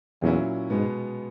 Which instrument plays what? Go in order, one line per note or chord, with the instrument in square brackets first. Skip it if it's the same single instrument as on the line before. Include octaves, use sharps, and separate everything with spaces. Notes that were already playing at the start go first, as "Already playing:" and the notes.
[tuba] E2 [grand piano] A#2 F#3 C#4 E4
[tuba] G#2 [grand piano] B2 G#3 B3